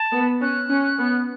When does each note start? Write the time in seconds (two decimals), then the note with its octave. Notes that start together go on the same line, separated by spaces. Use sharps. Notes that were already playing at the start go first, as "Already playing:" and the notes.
Already playing: A5
0.13 B3
0.41 C#4 F#6
0.70 C#4
0.98 B3